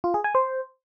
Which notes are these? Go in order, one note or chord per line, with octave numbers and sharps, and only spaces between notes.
F4
G#4
G#5
C5